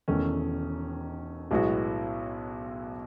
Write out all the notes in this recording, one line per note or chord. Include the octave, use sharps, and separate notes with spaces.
E1 E2 D#3 A3 C#4
B1 A2 G#3 B3 F#4